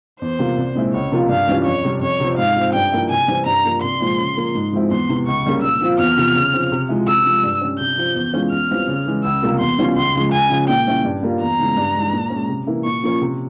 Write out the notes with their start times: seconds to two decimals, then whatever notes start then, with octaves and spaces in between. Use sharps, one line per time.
0.21 E2 C5
0.39 C3 G3 A#3 F4
0.58 C2
0.75 A#2 G#3 C4 E4
0.93 C#2 C#5
1.12 C3 F3 A#3 F4
1.29 G2 F5
1.47 E3 G3 C#4 F4
1.65 F2 C#5
1.84 C3 G3
2.02 F2 C#5
2.20 C3 F3 C4
2.38 G#2 F5
2.56 F3 C4
2.74 G2 G5
2.92 F3 A#3 E4
3.10 C3 G#5
3.28 E3 G3 C4
3.46 G2 A#5
3.64 F3 A#3
3.83 C2 C6
4.00 A#2 F3 G#3 C4
4.18 C#3
4.37 F3 A#3
4.55 G#2
4.73 F3 G#3 C4 E4
4.91 E2 C6
5.09 C3 E3
5.27 C#2 C#6
5.46 C#3 G3 A#3
5.62 A#2 E6
5.81 F3 C4 F4
5.99 E2 F6
6.17 C3 F3
6.36 C#3
6.53 F3 C4
6.72 C3
6.89 F3 G#3 E4
7.07 C3 E6
7.25 F3 G#3
7.43 G2
7.61 G3 C#4
7.80 C3 G6
7.98 F3 C4
8.15 E2
8.34 E3 G#3 C#4 F4
8.51 E2 F6
8.69 E3 G3 C4 F4
8.88 C#3
9.06 E3 G#3
9.24 C#2 E6
9.42 C3 G3 A#3 F4
9.60 E2 C6
9.78 E3 G3 C#4 F4
9.96 C#2 C6
10.15 C#3 F3 G#3
10.32 C#2 G#5
10.50 C#3 F3
10.68 A#2 G5
10.87 G3 C#4 E4
11.04 G2
11.23 G3 A#3 F4
11.41 E2 A#5
11.59 C#3 E3 G#3
11.77 G2
11.95 E3 G#3
12.13 A#2
12.30 G#3 C#4
12.49 C3
12.67 E3 A#3 E4
12.84 A#2 C#6
13.03 F3 A#3 C#4
13.21 C3